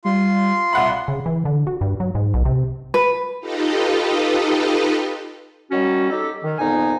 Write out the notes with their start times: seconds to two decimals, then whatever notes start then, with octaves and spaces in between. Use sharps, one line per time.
0.05 G3 F4 C6
0.73 C2 E5 F#5 B5
1.08 C#3
1.26 E3
1.45 D3
1.67 F#4
1.81 G2
2.00 F#3
2.15 G#2
2.34 B1
2.45 C3
2.94 B4
3.40 D#4 F4 G4 A4 B4 D#5
5.71 D#3 F#3 G3 C#4 F#4
6.10 D#4 G4 A4
6.43 D#3
6.59 F2 A#2 B3 D#4 G#5